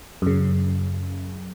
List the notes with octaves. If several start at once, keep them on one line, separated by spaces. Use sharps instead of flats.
F#2 C#3